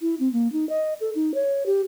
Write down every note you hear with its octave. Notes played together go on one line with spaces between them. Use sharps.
E4
C4
A#3
D#4
D#5
A4
D#4
C#5
G4